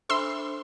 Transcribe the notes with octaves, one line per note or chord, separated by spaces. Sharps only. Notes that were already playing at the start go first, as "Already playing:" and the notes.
D4 A4 C5 E5 B5 C6 E6